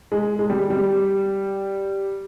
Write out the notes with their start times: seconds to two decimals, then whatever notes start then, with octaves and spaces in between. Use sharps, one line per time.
0.12 G#3
0.39 G#3
0.50 G3
0.70 G3